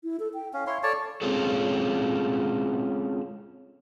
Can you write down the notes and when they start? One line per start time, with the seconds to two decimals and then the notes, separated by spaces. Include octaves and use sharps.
0.04 E4
0.20 A4
0.34 G5
0.53 C#4 F5
0.67 E4 C#5 C6
0.83 A4 C#5 D5 A5
1.22 G#3 C4 C#4 F4 G#4 A4